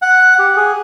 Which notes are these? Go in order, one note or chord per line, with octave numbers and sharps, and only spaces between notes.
F#5
G4
G#4